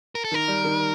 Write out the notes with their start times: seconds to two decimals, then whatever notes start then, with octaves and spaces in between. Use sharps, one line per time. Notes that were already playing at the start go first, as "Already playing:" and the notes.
0.15 A#4
0.24 A4
0.31 D#3
0.34 A#4
0.48 G3
0.64 D#3